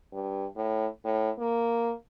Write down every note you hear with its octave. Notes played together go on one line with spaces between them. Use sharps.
G2
A2
A2
A#3